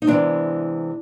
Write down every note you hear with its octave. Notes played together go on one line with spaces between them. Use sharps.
D#4
C3 E3 G#3 B3 C4 D4